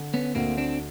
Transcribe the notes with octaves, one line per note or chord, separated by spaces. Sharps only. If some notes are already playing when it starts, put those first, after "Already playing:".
Already playing: D3
B3 C#4
D2 A#3 C4
C4 D4